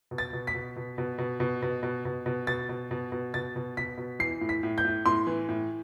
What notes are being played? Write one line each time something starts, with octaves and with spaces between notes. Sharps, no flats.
B2
A6
B2
B6
B2
B2
B2
B2
B2
B2
B2
B2
B2
B2 A6
B2
B2
B2
B2 A6
B2
B2 B6
B2
E3 C7
A2
B6
A2
G6
A2
A2 C6
E3
A2